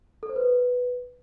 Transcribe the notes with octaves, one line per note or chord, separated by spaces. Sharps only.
A4
C5
B4